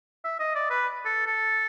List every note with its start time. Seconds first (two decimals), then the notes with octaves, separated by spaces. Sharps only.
0.24 E5
0.39 D#5
0.55 D5
0.70 B4
1.05 A4
1.26 A4